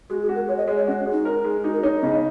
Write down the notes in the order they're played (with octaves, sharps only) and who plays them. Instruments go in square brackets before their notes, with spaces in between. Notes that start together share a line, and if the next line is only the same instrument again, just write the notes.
[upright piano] G#3 [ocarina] F#4
[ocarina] G#4
[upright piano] F#4
[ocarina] A#4
[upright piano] G#3 [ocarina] C#5
[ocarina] D#5
[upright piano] G#3 [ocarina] C#5
[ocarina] C#5
[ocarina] C#4 [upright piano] F#4
[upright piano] G#3
[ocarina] D#4
[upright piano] A#4
G#3
[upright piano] D#4 [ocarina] F#4
[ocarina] A#4
[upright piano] D#4 [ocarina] C#5
[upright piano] C#3 [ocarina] D#5